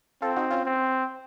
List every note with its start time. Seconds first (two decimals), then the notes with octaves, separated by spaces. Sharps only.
0.22 C4 F4 A4
0.36 D#4 F#4
0.50 C#4 F4
0.66 C4